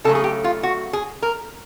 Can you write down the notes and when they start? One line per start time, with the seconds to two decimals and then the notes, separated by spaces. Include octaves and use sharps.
0.04 C#3 F#3 A3 A4
0.15 G#4
0.24 G4
0.44 F4
0.63 F#4
0.93 G#4
1.22 A#4